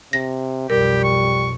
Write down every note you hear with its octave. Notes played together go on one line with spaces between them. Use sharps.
C3 A#6
B1 F2 G3 G4 A#4
C#6